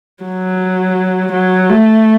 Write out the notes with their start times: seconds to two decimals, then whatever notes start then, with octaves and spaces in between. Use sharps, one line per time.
0.24 F#3
1.33 F#3
1.70 A3